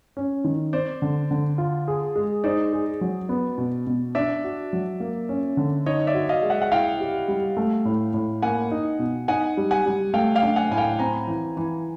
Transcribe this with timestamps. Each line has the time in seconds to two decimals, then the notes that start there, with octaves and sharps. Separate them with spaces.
0.17 C#4
0.44 D#3
0.73 C4 C5 D5
1.02 D3
1.31 D3
1.58 F4
1.88 G#4
2.16 G#3
2.44 D#4 C5 D5
2.73 G#4
3.01 F#3
3.29 B3
3.58 B2
3.87 B2
4.15 D4 D5 E5
4.44 F#4
4.73 F#3
5.00 A#3
5.29 C#4
5.57 D3
5.86 D#4 C#5 D#5
6.07 D5 E5
6.14 F#4
6.29 D#5 F5
6.43 G#3
6.50 E5 F#5
6.62 F#5
6.72 E4 F5 G5
7.00 G4
7.28 G3
7.57 A3
7.85 A2
8.14 A2
8.42 A#3 F#5 G#5
8.71 D#4
8.99 B2
9.28 D#4 F#5 G#5
9.57 G3
9.71 F#5 G#5
9.86 G3
10.14 A3 F5 G5
10.35 F5 G5
10.43 D4
10.56 F#5 G#5
10.71 A2 G#5
10.77 F5 G5
10.99 C4 G#5 A#5
11.27 E3
11.57 E3